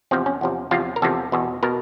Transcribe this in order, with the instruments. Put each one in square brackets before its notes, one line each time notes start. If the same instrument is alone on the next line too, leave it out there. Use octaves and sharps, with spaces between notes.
[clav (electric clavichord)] E2 C3 F3 C4
C#4
E2 C3 F3
E2 C3 F3 F4
A#4
E2 C3 F3 A4
E2 B2
B2 A#4